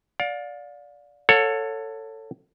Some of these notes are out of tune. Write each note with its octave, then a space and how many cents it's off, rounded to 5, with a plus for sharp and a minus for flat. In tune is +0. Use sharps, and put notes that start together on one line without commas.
D5 -10 F5 +35
A4 +20 C#5 +0 F#5 -40